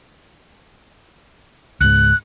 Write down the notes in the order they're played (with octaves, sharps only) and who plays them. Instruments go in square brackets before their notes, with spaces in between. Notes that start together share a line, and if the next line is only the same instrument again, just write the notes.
[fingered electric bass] C#2 G#2 [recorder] F#6